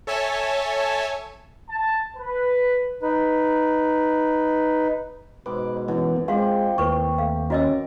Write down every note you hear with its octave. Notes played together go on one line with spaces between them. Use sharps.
A4 C#5 E5 G#5 A5
A5
B4
D#4 B4
G#2 B2 B4 D6
F#2 E3 B3
G#3 C4 F4 G4 F5 F#5 C6
D#2 A2 A#4 B4 C#6
A3 F5
C#4 F#4 A#4 D#5 E6